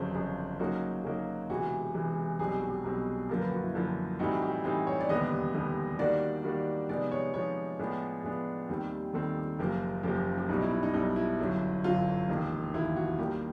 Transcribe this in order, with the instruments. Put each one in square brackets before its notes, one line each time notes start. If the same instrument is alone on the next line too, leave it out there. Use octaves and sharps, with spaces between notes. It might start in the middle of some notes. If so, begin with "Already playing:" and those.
Already playing: [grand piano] G1 F2 C#3 F#3 [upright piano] C5
[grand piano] G1 F2 C#3 F#3
C#3 F#3 A#3 D#4 F#4
C#3 F#3 A#3 D#4 F#4
[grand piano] E1 E2 C3 E3 G#3 [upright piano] F#4
[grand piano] E1 E2 C3 E3 G#3
[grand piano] B1 B2 G3 C4 [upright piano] G#4
[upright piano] G4
F#4
G4
[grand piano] B1 B2 G3 C4
[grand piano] F#2 D3 F3 A#3 [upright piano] A#4
[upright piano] B4
F#4
E4
[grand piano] F#2 D3 F3 A#3 [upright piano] E4
[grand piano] A2 E3 G3 C4 D#4 [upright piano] F#4
[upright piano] G4
[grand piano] A2 E3 G3 C4 D#4 [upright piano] G4
[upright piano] C#5
D5
[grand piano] E1 D#2 D3 G3 B3 [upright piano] D#5
[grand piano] E1 D#2 D3 G3 B3
[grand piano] D#3 G3 A#3 D4 F#4 [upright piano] D5
[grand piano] D#3 G3 A#3 D4 F#4
[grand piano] C3 F3 G#3 B3 D#4 [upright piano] D5
[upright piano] C#5
[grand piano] C3 F3 G#3 B3 D#4 [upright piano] C#5
[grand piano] A2 F3 G#3 B3 D4
[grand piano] A2 F3 G#3 B3 D4 [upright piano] G#4
[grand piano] D#2 D#3 G3 C4
[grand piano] D#2 D#3 G3 C4 [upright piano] A4
[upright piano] G4
[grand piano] F#1 F#2 C#3 F3 A#3 [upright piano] G4
[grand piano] F#1 F#2 C#3 F3 A#3 [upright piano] G4
[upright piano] G4
G4
[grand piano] B1 B2 G3 [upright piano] D#4
[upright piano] E4
E4
D#4
[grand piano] B1 B2 G3 [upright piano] D#4
[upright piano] E4
[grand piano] G1 F#2 D3 F#3
[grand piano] G1 F#2 D3 F#3 [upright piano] F4
[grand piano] E1 D#2 D#3
[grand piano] E1 D#2 D#3 [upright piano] E4
[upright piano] F#4
[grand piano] D#2 D#3 G3 A#3 D#4 [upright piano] G4